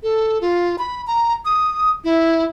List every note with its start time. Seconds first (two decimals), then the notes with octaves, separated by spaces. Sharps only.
0.03 A4
0.41 F4
0.78 B5
1.07 A#5
1.45 D#6
2.04 E4